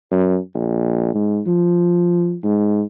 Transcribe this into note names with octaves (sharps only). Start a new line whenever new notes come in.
F#2
A#1
G#2
F3
G#2